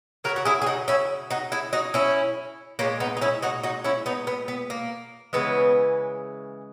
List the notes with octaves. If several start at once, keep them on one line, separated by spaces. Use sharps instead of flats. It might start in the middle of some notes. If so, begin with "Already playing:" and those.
C#3 F#3 F#4 A#4
F#4
E4 G#4
G#4
D#4 F#4
C#4 E4
D#4 F#4
E4 G#4
D#4 F#4
C#4 E4
A#2 G#3 A#3 C#4
B3 D#4
D#4
C#4 E4
D#4 F#4
D#4 F#4
C#4 E4
B3 D#4
B3
B3
A#3
C#3 E3 G#3 B3